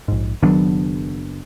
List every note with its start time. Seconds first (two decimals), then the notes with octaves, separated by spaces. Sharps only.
0.08 A#1 G#2
0.42 F#1 D#3 F#3 B3 D4